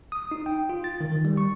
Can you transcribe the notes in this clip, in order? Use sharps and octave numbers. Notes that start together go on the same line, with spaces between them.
D#6
D#4
G5
F4
A6
D#3
D#3
G3
C#6